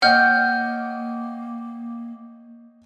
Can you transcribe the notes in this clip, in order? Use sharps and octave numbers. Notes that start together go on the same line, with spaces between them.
A#3 C#5 D#5 F#5 G5 F6 G6